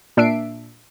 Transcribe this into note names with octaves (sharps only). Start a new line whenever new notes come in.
A#2 D4 E5 C7 D7